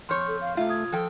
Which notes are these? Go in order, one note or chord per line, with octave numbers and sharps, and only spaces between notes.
F2 C#5 C6 F6 G6
A4
F5
C3 A3 F4 E5
D#6 G#6
F3 A4 G5